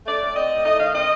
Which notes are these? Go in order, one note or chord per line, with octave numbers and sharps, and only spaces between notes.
A3 D5
A2
C4 D#5
A2
A3 D#5
D#3 F5
C4 D#5